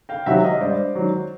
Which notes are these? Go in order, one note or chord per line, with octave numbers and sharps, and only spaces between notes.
F5 G5
C3 D#3 F#3 E5 F#5
D#5 F5
G2 C5 D5
D#3 F#3